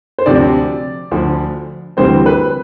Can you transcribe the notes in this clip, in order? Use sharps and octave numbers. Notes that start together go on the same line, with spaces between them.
C5
D2 C3 F3 C4 D5
D2 D3 F3
D2 C3 E3 G3 C4 C5
B4